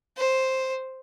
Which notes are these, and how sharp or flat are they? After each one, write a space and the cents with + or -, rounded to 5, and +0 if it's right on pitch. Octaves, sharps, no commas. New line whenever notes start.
C5 +5